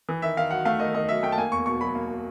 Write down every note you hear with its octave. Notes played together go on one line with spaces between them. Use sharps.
E3
D#3 E5
D#3 F5
F#3 F#5
A3 F5
D#3 D#5
D#3 D#5
F#3 E5
A3 G5
A5
A#3 G#5
E2 C#6
B2 C#6
F#3 B5
A#3